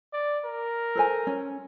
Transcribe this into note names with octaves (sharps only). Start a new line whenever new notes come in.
D5
A#4
A4 C5 G#5
C#4